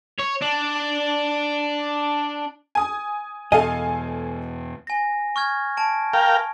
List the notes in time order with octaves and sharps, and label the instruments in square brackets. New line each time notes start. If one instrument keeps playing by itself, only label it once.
[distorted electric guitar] C#5
D4
[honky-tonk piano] G#5 D#6
[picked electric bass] E2 B2 [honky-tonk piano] A4 F5 G#5 [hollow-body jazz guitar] D#5
[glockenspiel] G#5 A#6
C#6 F6 G#6
A5 D7
[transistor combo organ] A#4 F5 G5